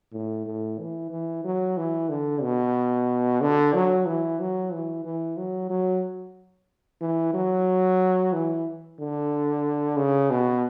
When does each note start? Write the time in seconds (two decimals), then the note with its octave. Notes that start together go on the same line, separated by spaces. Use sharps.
0.13 A2
0.46 A2
0.79 E3
1.11 E3
1.44 F#3
1.77 E3
2.09 D3
2.43 B2
3.41 D3
3.74 F#3
4.07 E3
4.40 F#3
4.73 E3
5.05 E3
5.37 F#3
5.70 F#3
7.01 E3
7.34 F#3
8.33 E3
8.99 D3
9.97 C#3
10.30 B2